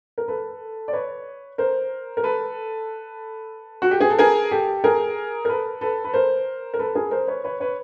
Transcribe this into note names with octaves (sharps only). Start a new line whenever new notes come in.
A#4
A4 B4
D5
B4 C#5
A#4 C5
A#4
A4 B4
F#4
G4
G#4
A4
G#4 A#4
G4 A4
G#4 A#4
A#4
A4 B4
A4 B4
B4
A#4 C5
A#4
A4 B4
G#4 A#4
A#4 C5
B4 C#5
B4 C#5
B4 C#5